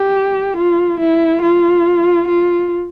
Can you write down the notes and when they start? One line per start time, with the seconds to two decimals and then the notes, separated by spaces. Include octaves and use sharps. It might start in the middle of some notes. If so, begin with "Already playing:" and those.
Already playing: G4
0.57 F4
1.00 E4
1.42 F4
2.28 F4